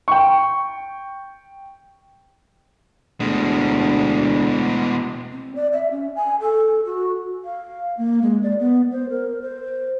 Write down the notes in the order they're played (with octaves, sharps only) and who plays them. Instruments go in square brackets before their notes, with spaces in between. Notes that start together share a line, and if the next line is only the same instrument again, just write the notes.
[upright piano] G5 C#6
[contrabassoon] D2 [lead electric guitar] B2 G#3
[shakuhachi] C4
D5
E5
C#4
G#5
A4
F#4
[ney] F5
A#3
G#3
D5
B3
C5
A#4
C5